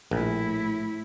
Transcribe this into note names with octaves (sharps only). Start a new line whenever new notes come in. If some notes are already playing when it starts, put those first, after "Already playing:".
A#1 A2 E4